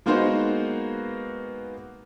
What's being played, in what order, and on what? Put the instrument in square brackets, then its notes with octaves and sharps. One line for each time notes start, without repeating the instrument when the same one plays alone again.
[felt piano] G#3 A#3 B3 D#4 F#4 C5